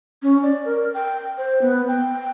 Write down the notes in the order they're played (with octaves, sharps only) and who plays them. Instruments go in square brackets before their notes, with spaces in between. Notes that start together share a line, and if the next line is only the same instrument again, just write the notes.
[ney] C#4
D5
A#4
G5
C5
B3
G5